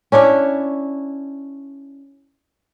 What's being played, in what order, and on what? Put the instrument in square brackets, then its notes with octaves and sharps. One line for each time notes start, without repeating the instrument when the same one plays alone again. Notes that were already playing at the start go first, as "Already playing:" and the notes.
[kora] C#4 D4 E4 C#5